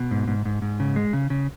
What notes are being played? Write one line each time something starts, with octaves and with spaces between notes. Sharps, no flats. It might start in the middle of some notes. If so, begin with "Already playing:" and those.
Already playing: B2
G#2
G#2
G#2
G#2
C#3
G#3
C#3
C#3